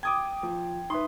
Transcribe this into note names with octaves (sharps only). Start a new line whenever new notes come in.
G5 D6 D#6 G#6
F3
D#4 B4 E5 C6